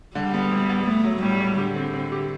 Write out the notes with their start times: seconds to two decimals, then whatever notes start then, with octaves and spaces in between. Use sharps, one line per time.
0.15 D3 G3
0.34 B3
0.51 D2
0.69 B3
0.87 A3 B3
1.04 F#3
1.22 A2 G3
1.40 A2
1.58 D3 G4
1.76 C4
1.94 C4
2.12 G4